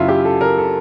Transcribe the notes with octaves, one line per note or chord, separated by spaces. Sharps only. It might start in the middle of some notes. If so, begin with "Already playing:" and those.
Already playing: F#2 C#3 F#3 E4 F4
G4
A4
A#4
A4